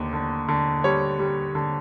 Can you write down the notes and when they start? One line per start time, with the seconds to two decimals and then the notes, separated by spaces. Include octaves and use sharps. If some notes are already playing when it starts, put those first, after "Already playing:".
Already playing: D#2 D3
0.13 D3
0.49 D3
0.84 G3 C#5
1.19 G3
1.55 D3